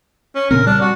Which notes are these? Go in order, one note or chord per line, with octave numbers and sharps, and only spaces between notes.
C#4
A#2 C#3 C4 A#4
G3 D4
F#4